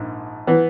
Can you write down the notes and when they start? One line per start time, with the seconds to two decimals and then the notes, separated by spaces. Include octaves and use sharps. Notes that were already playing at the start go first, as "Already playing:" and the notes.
Already playing: A#1 G#2
0.47 E3 B3